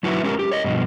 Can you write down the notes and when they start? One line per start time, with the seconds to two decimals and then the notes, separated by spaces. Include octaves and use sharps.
0.03 F#3 E4 F#4 B4 E5
0.23 G#3 C#4 G4 A#4
0.39 G4
0.51 C#5 D#5
0.64 G2 B2 F3